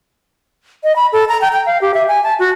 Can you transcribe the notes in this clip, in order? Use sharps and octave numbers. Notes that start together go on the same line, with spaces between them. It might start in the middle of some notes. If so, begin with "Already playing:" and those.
D#5
B5
A4
A#5
G5
G5
F5
G4
E5
G#5
A5
F#4